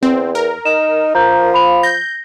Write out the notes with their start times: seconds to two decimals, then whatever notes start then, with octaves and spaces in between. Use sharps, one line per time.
0.03 E2 C4
0.35 A#4
0.66 D#4 E7
1.15 F3 A#5 G6
1.53 F5 B5 F7
1.83 G6 A#6